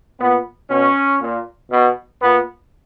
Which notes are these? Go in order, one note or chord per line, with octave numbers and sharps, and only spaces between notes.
A#2 B3
B2 C#4
A#2
B2
A#2 B3